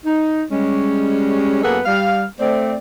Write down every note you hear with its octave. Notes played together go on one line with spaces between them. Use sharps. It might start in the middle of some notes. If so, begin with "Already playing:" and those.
D#4
G3 G#3 C#4
F#2 A#3 B3 G#4 A4 F#5
G3 F5
A3 C4 D5